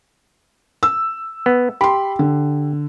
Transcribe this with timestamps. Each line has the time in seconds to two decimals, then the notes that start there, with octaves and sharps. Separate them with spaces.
0.83 E6
1.46 B3
1.81 G4 B5 C6
2.19 D3